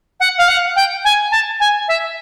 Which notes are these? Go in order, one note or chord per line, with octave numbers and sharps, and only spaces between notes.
F#5
F5
F#5
G5
G#5
A5
G#5
E5